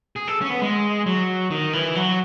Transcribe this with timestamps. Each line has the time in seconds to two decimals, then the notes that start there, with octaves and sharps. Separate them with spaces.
0.16 G#4
0.28 A4
0.41 C#4
0.50 B3
0.62 G#3
1.06 F#3
1.51 D#3
1.73 E3
1.95 F#3